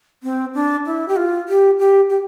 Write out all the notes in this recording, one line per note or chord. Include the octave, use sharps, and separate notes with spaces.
C4
D4
E4
G4
F4
G4
G4
G4